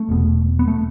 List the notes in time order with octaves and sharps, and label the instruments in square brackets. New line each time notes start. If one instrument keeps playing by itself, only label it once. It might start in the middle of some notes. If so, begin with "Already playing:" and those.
Already playing: [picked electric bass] A3
E1 E2 B2
B3
A3